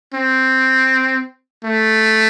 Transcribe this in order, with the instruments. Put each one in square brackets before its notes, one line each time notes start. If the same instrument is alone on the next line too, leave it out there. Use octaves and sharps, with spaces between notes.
[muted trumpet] C4
A3